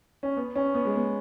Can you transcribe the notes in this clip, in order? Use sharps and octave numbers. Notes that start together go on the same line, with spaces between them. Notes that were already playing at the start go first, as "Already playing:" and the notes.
C#4
B3
C#4
B3
G#3
B3